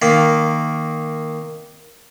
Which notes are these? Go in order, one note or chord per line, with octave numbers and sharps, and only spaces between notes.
D#3 A#3